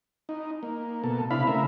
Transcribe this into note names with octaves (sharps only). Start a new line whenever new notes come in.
D#4
A#3
B2 A#3 A4
C3 D4 E4 F5 B5
C#3 A3 A#4 E5